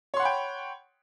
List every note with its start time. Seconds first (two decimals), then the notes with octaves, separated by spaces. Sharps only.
0.14 C#5
0.16 C6
0.19 F#5
0.22 B5
0.25 G5